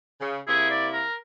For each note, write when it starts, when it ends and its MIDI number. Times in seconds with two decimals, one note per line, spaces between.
0.21 0.40 49
0.48 1.04 48
0.48 1.04 58
0.48 1.04 64
0.48 0.65 68
0.71 0.87 74
0.93 1.14 70